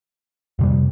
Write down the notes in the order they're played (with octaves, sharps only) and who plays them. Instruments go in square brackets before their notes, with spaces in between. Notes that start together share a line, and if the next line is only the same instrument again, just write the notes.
[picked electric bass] F2 C3 G3